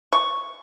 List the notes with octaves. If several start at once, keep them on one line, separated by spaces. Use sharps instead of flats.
C#6